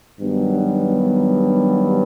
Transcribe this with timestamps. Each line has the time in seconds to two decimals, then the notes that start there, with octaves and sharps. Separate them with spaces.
0.19 G2 D#3 F#3 B3